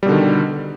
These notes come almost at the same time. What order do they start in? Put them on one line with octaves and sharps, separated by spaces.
G3 B2 D3 D#3